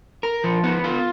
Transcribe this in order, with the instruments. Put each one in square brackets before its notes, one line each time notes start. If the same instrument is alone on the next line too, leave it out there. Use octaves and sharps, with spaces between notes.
[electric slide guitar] A#4
F3
B3
F4